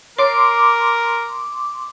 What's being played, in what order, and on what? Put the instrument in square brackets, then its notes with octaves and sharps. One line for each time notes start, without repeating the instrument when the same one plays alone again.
[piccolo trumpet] A#4 [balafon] C#5 [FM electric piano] C6 D6